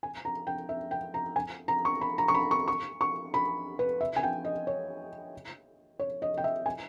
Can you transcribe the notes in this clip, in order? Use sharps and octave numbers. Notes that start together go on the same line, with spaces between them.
G#5
A#5
G5
E5
G5
A#5
G#5
A#5
C#6
B5
A#5
C#6
B5
C#6
C#6
C#6
B5
B4
E5
G#5
G5
D#5
C#5
C#5
D#5
G5
E5
G#5